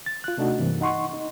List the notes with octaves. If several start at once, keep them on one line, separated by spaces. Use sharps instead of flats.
A6
F4 F#6
C3 A3 D4 D#4 F#4
G2 C3 E3 A#3
D#4 F#5 C6 C#6
D#4